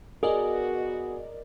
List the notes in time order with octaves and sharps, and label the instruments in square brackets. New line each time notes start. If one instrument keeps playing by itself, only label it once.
[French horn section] B3 F#4 [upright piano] G#4 [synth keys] A#4 D5 D#5